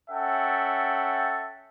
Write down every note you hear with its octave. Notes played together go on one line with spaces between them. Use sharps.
C#4 A4 E5 F#5 G5